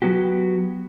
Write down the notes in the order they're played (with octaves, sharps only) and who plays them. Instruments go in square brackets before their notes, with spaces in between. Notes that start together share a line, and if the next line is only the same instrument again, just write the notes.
[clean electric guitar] F#3 B3 F#4 G4